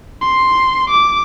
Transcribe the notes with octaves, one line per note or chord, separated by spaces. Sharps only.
C6
D6